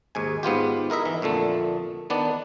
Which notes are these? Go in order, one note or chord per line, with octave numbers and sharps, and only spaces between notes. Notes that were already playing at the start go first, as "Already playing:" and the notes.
D#2 G#2 G#5
G#2 B3 F4 G4
E4 A#4 D#5 E5
E3
F2 A#2 D3 A3
D#3 B3 D4 D5